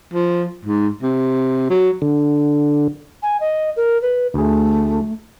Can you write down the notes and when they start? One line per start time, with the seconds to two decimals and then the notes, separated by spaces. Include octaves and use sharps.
0.14 F3
0.65 G#2
1.03 C3
1.70 F#3
2.02 D3
3.23 G#5
3.40 D#5
3.76 A#4
4.02 B4
4.34 D2 A3 G#4